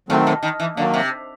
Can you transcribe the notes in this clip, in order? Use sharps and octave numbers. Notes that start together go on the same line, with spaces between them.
A2 D#3 F#3 A3 C4
B2
D#3
E3
D3 D#3 F#3 A#3
C3